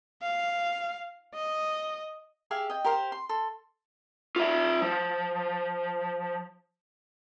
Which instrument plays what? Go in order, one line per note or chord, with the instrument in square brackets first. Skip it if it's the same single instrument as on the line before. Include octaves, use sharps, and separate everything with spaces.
[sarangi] F5
D#5
[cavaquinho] G4 G#4 E5 F5
D#5 G5
G4 A#4 C5 F5
C6
A4 C6
[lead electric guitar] F4 E5
F3